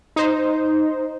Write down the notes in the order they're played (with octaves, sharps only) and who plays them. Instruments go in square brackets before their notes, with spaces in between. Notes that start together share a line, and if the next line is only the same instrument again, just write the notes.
[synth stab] D#4 C5